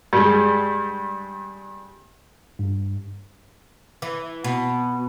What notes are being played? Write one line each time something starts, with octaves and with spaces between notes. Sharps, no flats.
G2 G3 G#3
G2
E3
B2